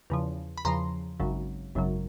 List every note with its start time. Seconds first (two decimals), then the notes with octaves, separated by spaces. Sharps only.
0.10 E2 C#3 F3
0.58 B5
0.65 E2 C#3 F3 A#5 C6
1.20 G#1 F#2 C#3 F#3
1.75 G#1 F#2 C#3 F#3